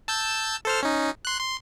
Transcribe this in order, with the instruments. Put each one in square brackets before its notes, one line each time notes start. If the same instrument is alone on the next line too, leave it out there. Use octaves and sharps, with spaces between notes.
[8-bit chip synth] A5 E6 G6
A4 C5 F6
C#4 D#4
C6 F#6
C6